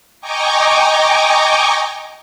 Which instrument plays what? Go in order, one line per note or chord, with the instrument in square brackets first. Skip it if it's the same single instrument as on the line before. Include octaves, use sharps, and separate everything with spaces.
[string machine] D#5 G5 G#5 A#5 C#6 D6